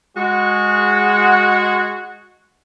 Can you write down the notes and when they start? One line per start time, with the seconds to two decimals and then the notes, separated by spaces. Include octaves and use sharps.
0.16 G#3 F#4